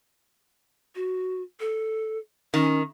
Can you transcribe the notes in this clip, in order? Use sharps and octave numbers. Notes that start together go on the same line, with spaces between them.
F#4
A4
D#3 C#4